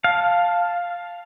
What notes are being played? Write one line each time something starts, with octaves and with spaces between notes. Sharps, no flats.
F5 A5